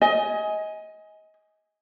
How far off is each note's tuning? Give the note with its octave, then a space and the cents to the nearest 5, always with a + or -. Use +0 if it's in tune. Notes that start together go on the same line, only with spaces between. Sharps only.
D#5 +25 G#5 +0